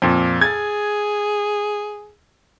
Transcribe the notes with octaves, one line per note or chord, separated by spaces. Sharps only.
F2 A#2
G#4 G#6 A6